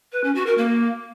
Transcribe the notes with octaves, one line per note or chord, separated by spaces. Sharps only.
B4
C#4
F#4
A#4
A#3